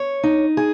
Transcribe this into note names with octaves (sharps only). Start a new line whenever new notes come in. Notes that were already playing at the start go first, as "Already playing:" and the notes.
Already playing: C#5
D#4
G#4